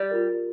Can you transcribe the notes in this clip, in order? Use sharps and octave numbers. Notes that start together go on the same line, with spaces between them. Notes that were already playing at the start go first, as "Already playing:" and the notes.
Already playing: G3
F4 A#4 D5